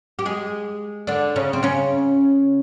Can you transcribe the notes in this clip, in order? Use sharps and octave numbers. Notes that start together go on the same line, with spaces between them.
G4
G#3 G#4
D3 D4
C#3 C#4
C4
C#3 C#4